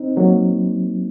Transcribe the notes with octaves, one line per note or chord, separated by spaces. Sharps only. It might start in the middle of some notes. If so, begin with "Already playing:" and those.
Already playing: C4 D#4
F#3 A#3